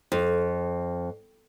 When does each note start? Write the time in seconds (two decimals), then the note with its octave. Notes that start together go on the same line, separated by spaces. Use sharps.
0.12 F2